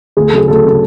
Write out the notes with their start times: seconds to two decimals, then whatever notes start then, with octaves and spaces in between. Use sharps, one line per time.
0.17 D2 G#4
0.27 A4
0.33 C#3 F#3 G#4
0.48 D2 A4
0.64 C#3 F#3